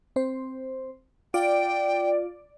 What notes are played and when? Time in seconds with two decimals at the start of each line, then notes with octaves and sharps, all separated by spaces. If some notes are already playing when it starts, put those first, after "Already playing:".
0.16 C4 C5
1.34 F4 D5 G5